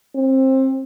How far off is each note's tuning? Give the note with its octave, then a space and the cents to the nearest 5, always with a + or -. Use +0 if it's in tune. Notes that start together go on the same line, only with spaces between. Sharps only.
C4 +20